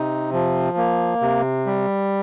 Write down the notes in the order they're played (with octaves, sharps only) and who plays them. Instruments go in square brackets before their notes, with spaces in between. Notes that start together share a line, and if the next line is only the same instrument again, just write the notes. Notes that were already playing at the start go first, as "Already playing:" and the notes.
Already playing: [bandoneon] C3 D#4
F3
A#3
C3
G3